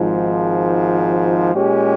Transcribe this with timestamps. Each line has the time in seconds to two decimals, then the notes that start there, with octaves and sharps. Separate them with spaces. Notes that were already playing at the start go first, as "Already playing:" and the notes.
Already playing: G#1 G#2 F3
1.53 A#2 G#3 C#4 G4